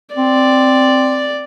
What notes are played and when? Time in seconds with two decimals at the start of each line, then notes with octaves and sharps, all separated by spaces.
0.16 C4 D5